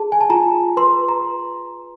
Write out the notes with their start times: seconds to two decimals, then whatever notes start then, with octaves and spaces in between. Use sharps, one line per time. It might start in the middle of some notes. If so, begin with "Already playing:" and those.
Already playing: G#4 A5
0.12 G#5
0.21 A5
0.30 F4 A#5
0.77 B4 C6
1.08 A#5